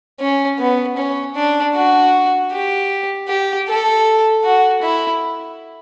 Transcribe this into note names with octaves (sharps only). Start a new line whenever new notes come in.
C#4
B3
C#4
D4
F#4
G4
G4
A4
F#4
E4